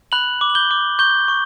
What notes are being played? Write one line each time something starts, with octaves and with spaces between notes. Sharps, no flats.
B5 F#6 F#7
D6
F#7
G6 G7
D6
C#6 G6 G7
C#6